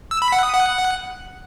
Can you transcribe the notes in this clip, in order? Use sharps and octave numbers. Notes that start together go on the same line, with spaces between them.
E6
B5
F#5
D#6
F#5